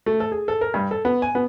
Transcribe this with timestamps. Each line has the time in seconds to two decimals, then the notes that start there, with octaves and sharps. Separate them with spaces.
0.06 A3
0.20 A4
0.32 G#4
0.48 A4
0.61 A#4
0.74 G2
0.91 A4
1.05 B3
1.22 G#5
1.35 B3